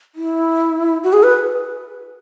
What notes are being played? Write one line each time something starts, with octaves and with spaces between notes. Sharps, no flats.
E4
F#4
G#4
B4